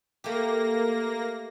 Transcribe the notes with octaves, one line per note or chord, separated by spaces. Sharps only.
A3 A#3 G4 A#6